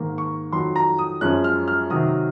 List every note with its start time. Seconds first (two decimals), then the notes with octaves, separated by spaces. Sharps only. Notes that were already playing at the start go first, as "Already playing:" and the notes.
Already playing: G#2 D#3 A#3
0.18 C#6
0.53 F2 D#3 F#3 C6
0.76 A#5
0.98 D#6
1.21 F#2 F3 G#3 C#4 F#6
1.44 F6
1.68 F6
1.90 C3 D#3 F#3 D#6